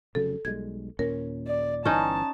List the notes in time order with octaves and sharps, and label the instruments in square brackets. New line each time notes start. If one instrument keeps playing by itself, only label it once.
[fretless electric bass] F1 C#3 F#3 [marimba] A4
[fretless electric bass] B1 G3 G#3 [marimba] G#6
[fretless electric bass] D#2 A#2 C#4 [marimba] A#4
[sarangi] D5
[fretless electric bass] G1 E3 [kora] C#4 D#4 [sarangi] A5 [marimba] C#6